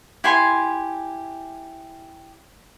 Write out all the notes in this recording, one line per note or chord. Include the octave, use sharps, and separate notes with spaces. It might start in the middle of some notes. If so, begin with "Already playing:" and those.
E4 G4 G#5 C6